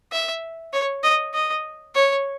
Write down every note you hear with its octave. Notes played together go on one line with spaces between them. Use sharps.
E5
C#5
D#5
D#5
C#5